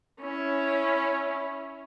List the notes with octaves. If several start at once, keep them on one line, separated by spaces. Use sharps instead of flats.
C#4 E4